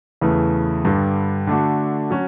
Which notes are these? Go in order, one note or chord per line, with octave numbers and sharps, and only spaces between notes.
E2 C#3 E3 A3
G2 D3 G3
D3 A3 D4 F#4
F#3 C#4 F#4